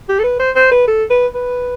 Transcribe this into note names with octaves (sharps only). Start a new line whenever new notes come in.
G4
A4
B4
C5
C5
B4
A4
B4
B4